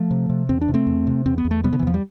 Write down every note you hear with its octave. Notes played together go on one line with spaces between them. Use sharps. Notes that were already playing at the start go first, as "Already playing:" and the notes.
Already playing: F3 A3
C3
C3
E2 C4
D4
C3
A3 C4
E2
C3
E2 C4
B3
E2
A3
C3 G3 B3
D3
E3
E2 F3
G3